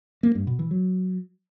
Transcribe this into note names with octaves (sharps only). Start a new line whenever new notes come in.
A#3
G2
B2
E3
F#3